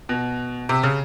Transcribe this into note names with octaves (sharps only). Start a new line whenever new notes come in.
B2
C3
C#3